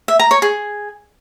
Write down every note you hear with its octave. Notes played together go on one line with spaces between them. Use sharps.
E5
A#5
C#5
G#4